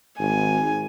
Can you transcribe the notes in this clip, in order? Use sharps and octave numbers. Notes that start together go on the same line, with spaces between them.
G#1 G#5